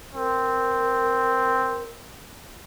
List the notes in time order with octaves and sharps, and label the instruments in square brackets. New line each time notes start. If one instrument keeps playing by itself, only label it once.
[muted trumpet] C4 [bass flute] A#4